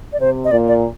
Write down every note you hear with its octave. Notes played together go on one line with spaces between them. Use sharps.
D5
C3 C5
D#5
A#2 D5
D5